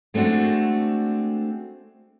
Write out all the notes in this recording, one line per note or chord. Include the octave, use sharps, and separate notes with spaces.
G#3 A3 C4 D4 F#4